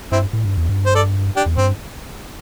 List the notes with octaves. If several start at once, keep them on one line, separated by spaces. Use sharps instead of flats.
G2 C4 E4
A2
G2
E2
G2
C5
A4 D5
D4 G4
E2
G2 C4